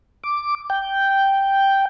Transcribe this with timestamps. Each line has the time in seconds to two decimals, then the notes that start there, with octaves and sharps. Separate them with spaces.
0.24 D6
0.70 G5